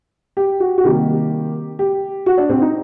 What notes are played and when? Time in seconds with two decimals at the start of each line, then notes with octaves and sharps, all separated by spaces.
0.37 G4
0.60 F#4
0.78 F#4
0.84 C3 D#3 G3 A#3 G4
1.79 G4
2.26 F#4
2.38 D4
2.50 C4
2.61 D#4